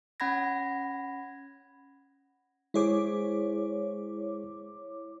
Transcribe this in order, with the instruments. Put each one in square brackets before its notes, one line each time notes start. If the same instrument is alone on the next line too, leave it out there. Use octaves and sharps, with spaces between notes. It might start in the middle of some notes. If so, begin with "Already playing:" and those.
[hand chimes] C#4 F#5 B5 G#6 A#6
[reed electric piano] G#3 G#4 C5 [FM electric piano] E4 C#5 D6